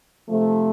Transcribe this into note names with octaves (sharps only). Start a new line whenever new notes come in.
C3 F3 A3